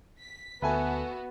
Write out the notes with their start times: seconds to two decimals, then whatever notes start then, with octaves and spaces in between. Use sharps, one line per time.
0.20 B6
0.62 D2 B3 F#4 A4 B4 E5 G#5